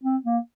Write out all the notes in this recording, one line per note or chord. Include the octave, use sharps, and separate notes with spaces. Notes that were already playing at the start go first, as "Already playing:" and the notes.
C4
A#3